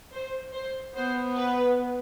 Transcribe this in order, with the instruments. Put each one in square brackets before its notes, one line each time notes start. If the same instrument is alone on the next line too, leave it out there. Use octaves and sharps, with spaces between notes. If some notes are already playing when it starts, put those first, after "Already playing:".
[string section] C5
C5
[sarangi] B3 [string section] C5
[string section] B4